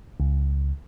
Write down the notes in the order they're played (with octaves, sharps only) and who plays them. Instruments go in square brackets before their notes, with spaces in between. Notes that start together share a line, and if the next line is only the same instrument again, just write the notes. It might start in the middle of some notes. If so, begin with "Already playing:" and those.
[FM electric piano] C#2